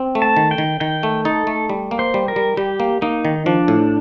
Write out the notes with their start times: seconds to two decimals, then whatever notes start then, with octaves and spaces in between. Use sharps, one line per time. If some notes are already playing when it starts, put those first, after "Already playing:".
Already playing: C4
0.15 A3
0.22 A5
0.37 D#3
0.51 G5
0.58 D#3
0.80 D#3 G5
1.03 A3
1.25 D#4 A4
1.47 A3
1.69 G3
1.91 A#3
1.99 C5
2.14 G3
2.28 A#4
2.36 G3
2.57 G3 G4
2.80 A#3
3.02 A#3 D#4
3.25 D#3
3.46 F3 D4
3.68 A2